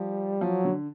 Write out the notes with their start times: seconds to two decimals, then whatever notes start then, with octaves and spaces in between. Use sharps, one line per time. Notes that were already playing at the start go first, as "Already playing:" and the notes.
Already playing: F3 G3
0.41 F3 F#3
0.64 D3